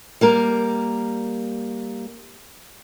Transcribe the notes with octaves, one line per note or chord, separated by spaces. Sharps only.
G3 A#3 A#4